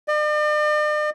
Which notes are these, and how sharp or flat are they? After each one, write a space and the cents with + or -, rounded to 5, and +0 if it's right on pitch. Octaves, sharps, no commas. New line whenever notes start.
D5 +45